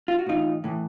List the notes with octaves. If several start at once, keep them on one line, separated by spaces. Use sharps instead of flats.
F4
F#4
A2 E3 D#4 F4
A2 E3